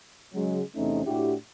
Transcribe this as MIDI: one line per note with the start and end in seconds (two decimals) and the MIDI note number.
0.34 0.62 49
0.34 0.62 54
0.34 0.62 56
0.76 1.05 40
0.76 1.05 48
0.76 1.05 57
0.76 1.05 60
0.76 1.05 61
0.76 1.05 63
1.05 1.34 45
1.05 1.34 62
1.05 1.34 64
1.05 1.34 66
1.05 1.34 67